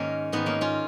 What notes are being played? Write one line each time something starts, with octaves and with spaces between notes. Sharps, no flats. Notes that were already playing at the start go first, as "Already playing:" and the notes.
Already playing: G#2 D#3 A#3 C#4
G#2 D#3 B3 D#4
A#3 C#4
C#4 F4